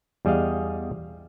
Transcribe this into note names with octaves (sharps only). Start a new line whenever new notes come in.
E2 G3 G#4 D#5 F5